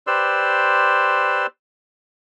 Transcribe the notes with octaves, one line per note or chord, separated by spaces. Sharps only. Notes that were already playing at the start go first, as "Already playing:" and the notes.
G4 B4 C5 D5 C6 E6